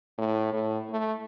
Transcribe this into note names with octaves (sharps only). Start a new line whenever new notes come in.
A2
A2
A3